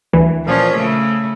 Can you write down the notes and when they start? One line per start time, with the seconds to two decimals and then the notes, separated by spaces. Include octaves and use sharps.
0.13 D2 E3
0.45 A#2 F3 C#4
0.77 C#3 A3